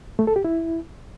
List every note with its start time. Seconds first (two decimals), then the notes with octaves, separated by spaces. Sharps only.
0.19 A3
0.27 A4
0.36 G4
0.45 E4